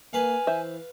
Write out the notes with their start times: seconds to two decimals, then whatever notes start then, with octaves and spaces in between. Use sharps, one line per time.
0.13 A#3 B4 F5 G#5
0.47 E3 C5 E5